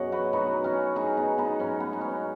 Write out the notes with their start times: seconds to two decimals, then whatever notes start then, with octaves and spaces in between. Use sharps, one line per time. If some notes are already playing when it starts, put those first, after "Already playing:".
Already playing: F#2 B2 F#3 G#4 C#5 D#5 F#5
0.12 F#4 B4
0.33 B2 F#3 B3 D#4
0.64 C#4 F#4
0.96 B2 F#3 D#4 G#4
1.17 B3 D#4
1.38 B3 D#4
1.59 G#2 F#3 C#4
1.80 B3
1.93 D#4
2.01 C#4